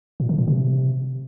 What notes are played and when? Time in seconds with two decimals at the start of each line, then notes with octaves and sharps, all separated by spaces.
0.20 A#2
0.29 D3
0.38 A#2
0.48 C3